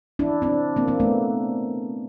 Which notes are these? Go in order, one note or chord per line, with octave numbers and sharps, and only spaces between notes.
D4 E4
C4 D4
A#3 C4
A#3 C4
A3 B3